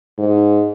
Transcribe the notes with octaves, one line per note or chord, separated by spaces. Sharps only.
G#2